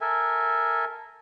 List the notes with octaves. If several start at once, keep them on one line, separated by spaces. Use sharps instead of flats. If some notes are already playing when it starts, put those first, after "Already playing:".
A4 A#4 E5 G#5